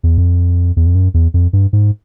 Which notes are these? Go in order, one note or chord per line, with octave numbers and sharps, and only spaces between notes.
E2
F2
E2
F2
F#2
E2
F2
G2
G#2